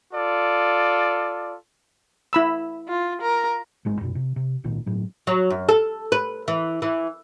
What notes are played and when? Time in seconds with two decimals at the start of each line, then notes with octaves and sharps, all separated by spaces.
0.14 F4 A4 D5
2.33 E4 B5 E6
2.88 F4
3.22 A#4
3.85 A1 G#2 G#3
4.01 F#2 B2
4.15 C3
4.36 C3
4.64 G#1 C#2 A#2 D#3
4.86 G1 A2 F#3
5.27 F#3
5.50 F#2
5.69 A4
6.12 B4
6.48 E3
6.82 E3